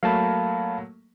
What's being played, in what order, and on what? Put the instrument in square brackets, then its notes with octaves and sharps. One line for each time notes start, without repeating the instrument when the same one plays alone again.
[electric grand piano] F#3 A3 A#3 [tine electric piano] F5 A5 B5